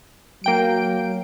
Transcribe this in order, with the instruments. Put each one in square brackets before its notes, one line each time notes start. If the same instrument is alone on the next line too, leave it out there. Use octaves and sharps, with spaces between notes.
[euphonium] F#3 [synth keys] A#3 G5 D7